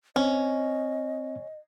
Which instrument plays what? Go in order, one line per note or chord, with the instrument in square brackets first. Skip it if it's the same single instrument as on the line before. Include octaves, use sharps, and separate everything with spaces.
[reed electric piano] C4 [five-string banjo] C#4 [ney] D#5